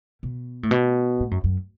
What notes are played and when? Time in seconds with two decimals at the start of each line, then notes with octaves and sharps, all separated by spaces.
0.23 B2
0.63 A2
0.71 B2
1.20 A2
1.31 F#2
1.44 F#2